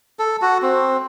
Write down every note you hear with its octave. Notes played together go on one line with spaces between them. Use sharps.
A4
F#4
C4